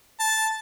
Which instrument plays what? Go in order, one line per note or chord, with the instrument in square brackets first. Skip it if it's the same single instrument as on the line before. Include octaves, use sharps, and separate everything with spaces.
[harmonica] A5